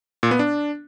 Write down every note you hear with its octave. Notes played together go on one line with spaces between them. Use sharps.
A#2
B3
D4